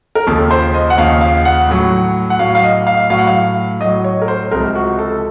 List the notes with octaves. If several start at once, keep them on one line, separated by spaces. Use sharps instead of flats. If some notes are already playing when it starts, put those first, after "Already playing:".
A#4
D#2 C#3 F3 A4
C5
D#5
F#5
D#2 C#3 F3 F5
F5
F#5
A2 F#3
F#5
A2 F#3 F5
F5
D#5
F5
A2 F#3 F5
F#5
F5
A2 F#3 D#5
C#5
A#4
C5
C#2 C3 F3 A#4
F#4
A4